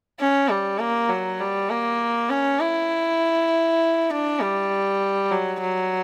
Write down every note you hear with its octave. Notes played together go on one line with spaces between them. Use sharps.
C#4
G3
A#3
F#3
G3
A#3
C#4
E4
D4
G3
F#3
F#3